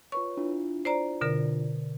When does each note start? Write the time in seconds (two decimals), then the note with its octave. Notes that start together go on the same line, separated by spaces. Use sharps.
0.12 F4 B4 C#5 C#6
0.37 D4 E4 F4
0.85 C5 D5 A#5
1.21 B2 D3 A#4